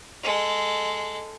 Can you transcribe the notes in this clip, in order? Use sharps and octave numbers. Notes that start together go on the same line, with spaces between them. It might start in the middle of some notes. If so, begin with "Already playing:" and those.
G#3 A4